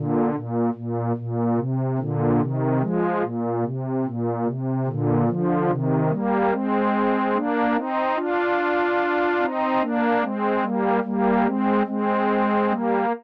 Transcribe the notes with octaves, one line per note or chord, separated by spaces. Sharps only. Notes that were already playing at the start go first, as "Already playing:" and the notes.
Already playing: A#2 D3
A#2
A#2
A#2
C3
A#2 D3
C3 D#3
F3 G#3
A#2
C3
A#2
C3
A#2 D3
D3 F3
C3 D#3
G3 A#3
G#3 C4
A#3 D4
C4 D#4
D4 F4
C4 D#4
A#3 D4
G#3 C4
G3 A#3
G3 A#3
G#3 C4
G#3 C4
G3 A#3